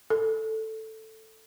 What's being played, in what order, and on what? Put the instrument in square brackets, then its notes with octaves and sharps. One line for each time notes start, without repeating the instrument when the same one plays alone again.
[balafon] A4